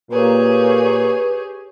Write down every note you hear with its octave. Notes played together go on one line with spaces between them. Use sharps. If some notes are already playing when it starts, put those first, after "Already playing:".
A#2 A#3 G4 G#4 B4 C#5